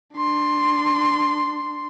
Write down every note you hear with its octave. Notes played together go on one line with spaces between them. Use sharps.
D4 C6